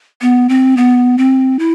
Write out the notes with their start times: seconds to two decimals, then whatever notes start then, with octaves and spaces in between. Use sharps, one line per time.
0.22 B3
0.49 C4
0.77 B3
1.18 C4
1.59 E4